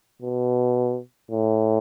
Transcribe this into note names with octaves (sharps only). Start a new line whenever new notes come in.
B2
A2